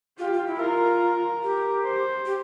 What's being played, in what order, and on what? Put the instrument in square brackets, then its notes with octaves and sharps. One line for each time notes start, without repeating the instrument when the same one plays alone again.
[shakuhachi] F4 [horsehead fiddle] G4
[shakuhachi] F4
E4
[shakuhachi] F4 [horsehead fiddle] A#4
[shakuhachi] G4
[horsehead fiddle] C5
[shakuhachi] G4